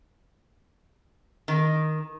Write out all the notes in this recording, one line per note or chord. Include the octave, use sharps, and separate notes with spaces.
D#3